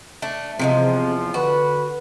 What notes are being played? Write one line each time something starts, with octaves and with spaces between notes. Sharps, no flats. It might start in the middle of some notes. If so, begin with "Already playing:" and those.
A3 D4
E2 C3 E3 F3 G#3
D3 F#4 B4